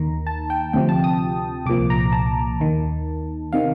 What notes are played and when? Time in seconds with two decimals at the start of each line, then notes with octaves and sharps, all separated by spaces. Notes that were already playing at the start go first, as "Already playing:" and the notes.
Already playing: D#2 D#3 A#5
0.27 A5
0.50 G5
0.73 D2 C3 F3 G5
0.89 A5
1.04 D#6
1.66 C2 A#2 F3 D6
1.90 A#5
2.13 A5
2.60 D#2 D#3
3.53 C3 D#3 F5